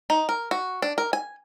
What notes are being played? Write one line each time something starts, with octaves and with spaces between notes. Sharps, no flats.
D#4
A#4
F#4
D4
A#4
G#5